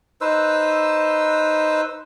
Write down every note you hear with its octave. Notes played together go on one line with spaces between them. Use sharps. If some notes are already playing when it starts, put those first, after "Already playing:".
D#4 B4 C5 E6